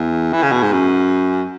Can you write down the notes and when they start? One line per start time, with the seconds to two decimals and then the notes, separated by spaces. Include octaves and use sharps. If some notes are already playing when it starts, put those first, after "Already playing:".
Already playing: E2
0.33 E3
0.43 C#3
0.52 B2
0.62 G#2
0.73 F#2